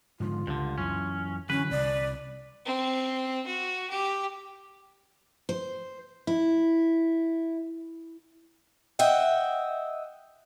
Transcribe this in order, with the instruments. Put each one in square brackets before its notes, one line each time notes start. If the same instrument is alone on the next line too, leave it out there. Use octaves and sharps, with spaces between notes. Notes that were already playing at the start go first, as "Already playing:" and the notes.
[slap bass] G#2 D3 F3 [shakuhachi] F4
[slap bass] C#2 [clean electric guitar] G2 D3
[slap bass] F#2 E3 [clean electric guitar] C#4
[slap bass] D3 E3 F#3 [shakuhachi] C#4 [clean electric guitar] B4
[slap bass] C2 [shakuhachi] D5
[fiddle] C4
F#4
G4
[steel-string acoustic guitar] C5
E4
D#5 E5 F#5 G5